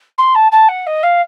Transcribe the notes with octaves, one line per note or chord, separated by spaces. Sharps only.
C6
A5
A5
F#5
D#5
F5